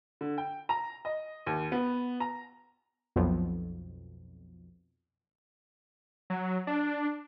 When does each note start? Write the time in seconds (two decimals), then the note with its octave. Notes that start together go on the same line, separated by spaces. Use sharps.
0.21 D3
0.38 G5
0.69 A#5
1.05 D#5
1.46 D#2
1.72 B3
2.20 A#5
3.16 B1 F2
6.30 F#3
6.67 D4